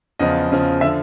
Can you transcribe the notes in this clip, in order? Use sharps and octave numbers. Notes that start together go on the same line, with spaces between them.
E2 C#3 F3 D#5
E2 C#3 F3
D3 F3 E5